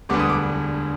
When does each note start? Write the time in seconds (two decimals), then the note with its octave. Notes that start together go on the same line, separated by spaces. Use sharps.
0.09 E1 D2 D3 G3 B3 D6
0.19 D#6
0.30 D6